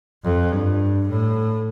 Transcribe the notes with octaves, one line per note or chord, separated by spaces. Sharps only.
F2
G2
A2